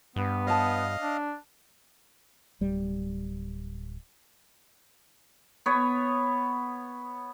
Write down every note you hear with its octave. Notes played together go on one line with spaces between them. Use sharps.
G2 B3
C#5 D#5 F5 A5
D4
D1 G3
B3 C#5